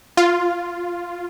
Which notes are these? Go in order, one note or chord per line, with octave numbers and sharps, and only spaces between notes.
F4